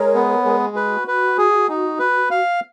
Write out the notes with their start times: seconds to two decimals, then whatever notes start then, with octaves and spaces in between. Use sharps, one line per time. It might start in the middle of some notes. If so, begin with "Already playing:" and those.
Already playing: G#3 A#4 C#5
0.15 B3
0.45 G#3
0.76 F#4 B4
1.08 B4
1.38 G#4
1.69 D#4
1.99 B4
2.31 F5